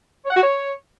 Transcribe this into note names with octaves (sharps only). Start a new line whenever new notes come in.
C#5
F#5
F#4
C#5